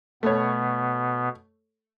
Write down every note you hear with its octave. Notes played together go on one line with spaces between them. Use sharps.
B2 A3 B3 C#5